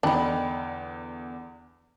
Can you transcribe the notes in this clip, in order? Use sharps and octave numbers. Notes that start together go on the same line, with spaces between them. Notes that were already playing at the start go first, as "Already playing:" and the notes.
E2 D3 D4 D#4 G5 B5